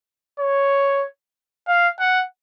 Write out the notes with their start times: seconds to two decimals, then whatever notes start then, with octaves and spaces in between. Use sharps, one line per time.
0.40 C#5
1.67 F5
2.00 F#5